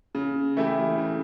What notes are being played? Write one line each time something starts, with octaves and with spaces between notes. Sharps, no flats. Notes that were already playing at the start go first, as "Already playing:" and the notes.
C#3
E3 A3 E4 G4
C#3